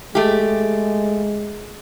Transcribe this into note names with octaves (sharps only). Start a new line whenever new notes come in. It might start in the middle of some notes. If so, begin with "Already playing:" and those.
G#3 A3 G4